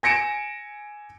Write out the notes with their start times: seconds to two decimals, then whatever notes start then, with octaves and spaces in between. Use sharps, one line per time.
0.03 G#5 A#6 C#7 D7 E7